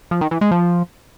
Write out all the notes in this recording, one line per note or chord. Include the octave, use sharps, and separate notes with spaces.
F3
D#3
E3
G#3
F3